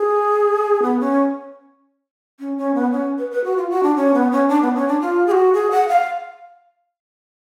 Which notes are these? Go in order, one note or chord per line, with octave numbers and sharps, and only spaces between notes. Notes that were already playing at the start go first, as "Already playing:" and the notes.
Already playing: G#4
B3
C#4
C#4
C#4
B3
C#4
B4
B4
F#4
F4
F#4
D4
C#4
B3
C#4
D4
B3
C#4
D4
F4
G#4
F#4
G#4
F#5
F5